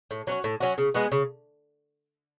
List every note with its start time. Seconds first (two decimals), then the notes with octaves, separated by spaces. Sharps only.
0.11 A2
0.27 F#3 C#4 F#4
0.44 A2
0.60 F#3 C#4 F#4
0.78 C#3
0.94 G#3 B3 F#4
1.12 C#3